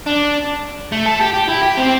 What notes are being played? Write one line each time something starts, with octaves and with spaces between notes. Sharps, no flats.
D4
A3
A4
G4
G4
E4
G4
C4